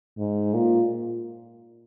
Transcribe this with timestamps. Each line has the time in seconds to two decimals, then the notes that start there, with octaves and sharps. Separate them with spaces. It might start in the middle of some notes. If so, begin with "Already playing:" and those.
0.18 G#2
0.53 A#2